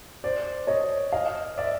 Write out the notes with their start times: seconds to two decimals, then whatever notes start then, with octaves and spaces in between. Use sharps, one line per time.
0.24 C5 D5
0.67 C#5 D#5
1.12 D#5 F5
1.58 D5 E5